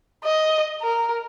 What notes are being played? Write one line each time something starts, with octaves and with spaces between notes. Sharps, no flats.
D#5
A#4